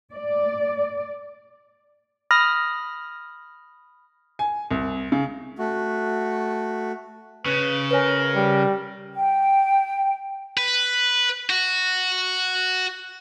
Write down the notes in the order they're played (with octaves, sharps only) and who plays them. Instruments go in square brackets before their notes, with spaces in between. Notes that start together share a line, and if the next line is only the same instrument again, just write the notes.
[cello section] D5
[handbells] B5 D#6 F6 A#6
[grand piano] G#5
C2
C#3
[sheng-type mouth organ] A3 F#4
[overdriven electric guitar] C#3 [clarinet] B4
[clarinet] A#4 [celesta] B4 C#5 G#5
[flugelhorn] G3
[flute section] G5
[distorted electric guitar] B4
F#4